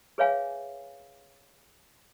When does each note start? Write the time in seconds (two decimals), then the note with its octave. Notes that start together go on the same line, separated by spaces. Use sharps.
0.18 G#4 B4 C#5 E5 F5 G#5